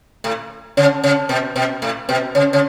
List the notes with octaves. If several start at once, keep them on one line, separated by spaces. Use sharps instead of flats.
A2
C#3
C#3
B2
B2
A2
B2
C#3
C#3